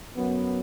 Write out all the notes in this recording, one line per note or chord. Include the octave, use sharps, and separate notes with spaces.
F#2 F#3 B3